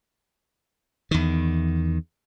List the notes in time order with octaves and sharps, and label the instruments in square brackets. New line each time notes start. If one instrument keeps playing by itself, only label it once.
[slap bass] E2 D#3